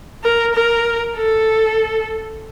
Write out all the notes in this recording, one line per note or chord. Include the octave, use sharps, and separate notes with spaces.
A#4
A#4
A4